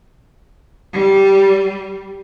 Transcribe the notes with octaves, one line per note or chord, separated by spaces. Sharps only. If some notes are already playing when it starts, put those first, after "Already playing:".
G3